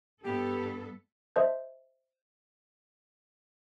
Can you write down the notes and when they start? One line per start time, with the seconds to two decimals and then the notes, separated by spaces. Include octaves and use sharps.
0.24 G2 B3 G4 A4
1.36 C5 D#5 E5 A5 G6